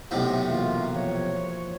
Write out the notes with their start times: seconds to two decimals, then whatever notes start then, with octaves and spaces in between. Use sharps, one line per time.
0.11 B1 A2 C3 C4
0.50 E3 A#3 F4 F#4
0.96 F3 C#5